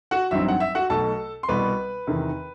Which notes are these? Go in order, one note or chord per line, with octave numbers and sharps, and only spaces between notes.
F#4 F#5
A1 G2 F#3 C4 D#4 E5
F#5
E5
F#4 F#5
B1 B2 A3 A4 A5
C6
C2 B2 G3 B3 B4 B5
E2 C3 D#3